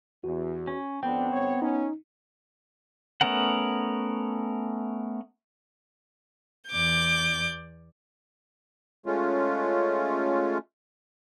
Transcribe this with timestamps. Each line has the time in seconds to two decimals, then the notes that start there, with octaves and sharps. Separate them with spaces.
0.24 E2 F#4
0.67 C#4
1.03 G#1 F2 B3 C4 D4 G5
1.33 G1 C#5
1.62 C#4 D#4
3.21 A3 B3 C#4 A#4 F#5
6.70 E2 D5 D6 G6
9.06 G#3 A3 C#4 F4